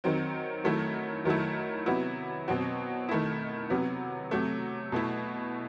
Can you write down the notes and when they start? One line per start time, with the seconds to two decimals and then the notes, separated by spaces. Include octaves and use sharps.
0.04 D#3 F#3 C4
0.64 D#3 F#3 A3 E4
1.25 D#3 F#3 A3 E4
1.86 C3 F#3 B3 E4
2.48 B2 F#3 C4 F#4
3.09 D#3 A3 E4
3.70 C3 F#3 B3
4.31 C3 F#3 A3
4.92 B2 A3 E4